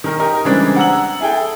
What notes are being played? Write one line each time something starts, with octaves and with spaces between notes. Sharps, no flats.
D#3 A#4
D#4 G4 A#4
C#3 E3 G3 G#3 C4 D4
F#5 A#5 E6 F#7
E4 G#4 A4 G5